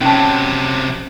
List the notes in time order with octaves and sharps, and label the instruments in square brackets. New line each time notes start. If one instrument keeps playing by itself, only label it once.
[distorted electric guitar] C3 F#3 [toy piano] C#4 A5